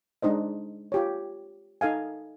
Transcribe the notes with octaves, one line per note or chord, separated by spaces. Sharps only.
G#3 D4 D#4 C5 D#5
F4 G4 C#5
D#4 A4 F5 G#5